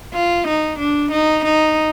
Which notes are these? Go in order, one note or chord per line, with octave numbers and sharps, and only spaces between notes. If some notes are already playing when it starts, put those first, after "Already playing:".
F4
D#4
D4
D#4
D#4